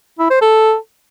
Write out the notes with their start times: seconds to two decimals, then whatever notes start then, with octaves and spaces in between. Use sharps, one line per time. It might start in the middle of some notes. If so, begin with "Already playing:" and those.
0.19 E4
0.30 C5
0.42 A4